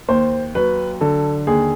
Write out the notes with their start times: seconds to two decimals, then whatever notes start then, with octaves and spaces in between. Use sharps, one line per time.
0.08 D#2 C5
0.55 F#3 B4
1.01 D3 A4
1.47 D#2 G#4